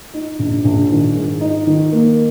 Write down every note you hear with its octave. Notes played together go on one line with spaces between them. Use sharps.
D#4
A#1
A#1
D#3
G#2
D#4
D#3
A#3